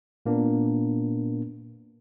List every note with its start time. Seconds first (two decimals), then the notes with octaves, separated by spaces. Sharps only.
0.26 A#2 A#3 B3 D4